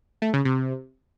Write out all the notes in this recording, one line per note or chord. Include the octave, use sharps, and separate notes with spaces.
A3
C#3
C3